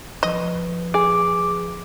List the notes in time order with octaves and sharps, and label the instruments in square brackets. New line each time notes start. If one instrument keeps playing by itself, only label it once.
[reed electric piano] F3 B4 [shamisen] D#5
[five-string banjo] G#4 [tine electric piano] D6